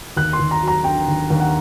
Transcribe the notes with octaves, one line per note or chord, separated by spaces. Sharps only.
D#2 F#6
C6
D#2
A#5
F#3
A#5
D3 G5
D#2
D#2
F#5